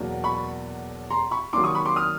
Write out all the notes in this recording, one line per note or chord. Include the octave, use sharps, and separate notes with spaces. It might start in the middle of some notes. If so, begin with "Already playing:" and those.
Already playing: E2 B2 F#3 A#3 D4
B5 C#6
A#5 C6
B5 C#6
D#3 F#3 A#3 D4 C6 D6
C#6 D#6
B5 C#6
C6 D6
D#6 F6